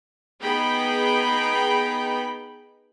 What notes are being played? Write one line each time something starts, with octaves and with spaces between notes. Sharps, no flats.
B3 D#4 G#4 G5 B5